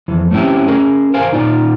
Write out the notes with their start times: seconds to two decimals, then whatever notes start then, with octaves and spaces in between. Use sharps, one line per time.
0.08 F2 E3
0.31 A3 C4 C#4 E4 G4
0.68 C#4 G#4 A#4
1.14 A#4 C5 F5 G#5
1.32 A#2 D#4 F4 D5